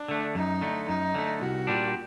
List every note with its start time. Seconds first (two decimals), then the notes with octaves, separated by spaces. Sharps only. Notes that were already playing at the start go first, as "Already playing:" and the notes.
Already playing: D4
0.08 D3 A3
0.35 F#2 D#4
0.61 D3 A3
0.88 F#2 D#4
1.14 D3 A3
1.41 C2 F#4
1.67 A#2 G3 D4